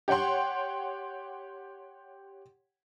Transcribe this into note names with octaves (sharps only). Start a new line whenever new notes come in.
G4 C#5 F#5 G5 C6